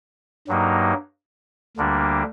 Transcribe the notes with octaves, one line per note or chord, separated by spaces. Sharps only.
G2 F#3 A#3 D#4
D2 D3 G3 A#3 D4